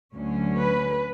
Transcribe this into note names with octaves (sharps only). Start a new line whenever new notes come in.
D2 D3 F#3 C#4
B4